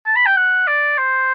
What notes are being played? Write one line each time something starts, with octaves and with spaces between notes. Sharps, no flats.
A5
B5
G5
F#5
D5
C5